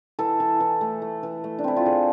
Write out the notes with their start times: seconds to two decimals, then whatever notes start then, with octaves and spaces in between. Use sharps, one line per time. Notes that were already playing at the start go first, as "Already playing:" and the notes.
0.19 E3 A4
0.40 E3
0.60 E3
0.81 A3
1.02 A3
1.23 E3
1.44 A3
1.59 D4
1.64 C4 E4
1.77 F4
1.86 D3 G#4